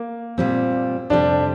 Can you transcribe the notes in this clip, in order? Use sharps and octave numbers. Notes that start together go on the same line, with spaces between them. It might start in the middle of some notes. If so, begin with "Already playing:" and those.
Already playing: A#3
A#2 G3 C4
F2 C3 G3 D4